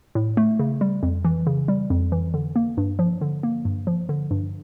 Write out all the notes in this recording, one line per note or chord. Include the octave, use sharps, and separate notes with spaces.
A2
A3
C#3
G3
F2
E3
C#3
G3
F2
E3
D3
A#3
G2
F3
D3
A#3
G2
F3
D3
G2